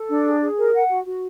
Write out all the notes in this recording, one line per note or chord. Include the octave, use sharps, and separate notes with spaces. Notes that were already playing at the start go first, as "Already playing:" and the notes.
Already playing: A4
D4
G#4
G#4
A#4
F#5
F#4
F#4